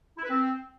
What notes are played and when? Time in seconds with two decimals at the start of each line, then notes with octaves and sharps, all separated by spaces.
0.18 E4
0.24 B4
0.30 C4